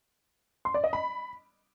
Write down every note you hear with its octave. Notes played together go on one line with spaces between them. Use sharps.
C6
D5
D#5
B5